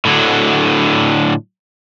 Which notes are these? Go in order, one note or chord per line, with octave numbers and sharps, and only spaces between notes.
A2 D3 F#3